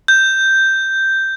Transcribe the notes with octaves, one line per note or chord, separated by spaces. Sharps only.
G6